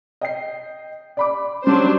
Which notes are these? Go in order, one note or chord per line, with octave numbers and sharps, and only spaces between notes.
D#5 G5 C7
D5 B5 D6
F#3 G3 C#4 D4 C5